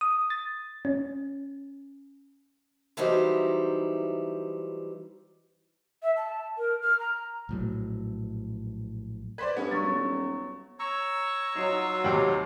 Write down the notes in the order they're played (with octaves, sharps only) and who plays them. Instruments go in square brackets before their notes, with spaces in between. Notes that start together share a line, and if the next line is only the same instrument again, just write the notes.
[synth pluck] D#6
A6
C#4
[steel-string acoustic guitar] E3 F#3 G3 D#4 E4 C5
[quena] E5
A5
A#4
F6
A#5
[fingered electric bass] A#1 A2 F#3
[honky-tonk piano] B4 C5 D5 [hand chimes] G#6 B6
[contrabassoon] G2 [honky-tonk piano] B3 C#4
[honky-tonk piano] F#3 [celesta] C#6 A6
[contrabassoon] D#1 [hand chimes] B3 C#5
[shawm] C#5 [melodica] A#5 C#6 E6
[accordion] F#3 [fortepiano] D#4 [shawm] F4
[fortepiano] D#2 C3 G5